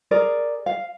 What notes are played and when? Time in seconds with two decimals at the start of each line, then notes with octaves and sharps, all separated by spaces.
0.11 G#4 A#4 D5
0.66 F5